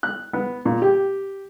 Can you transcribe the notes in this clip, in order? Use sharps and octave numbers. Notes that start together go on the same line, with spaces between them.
F#6
B3
A#2
G4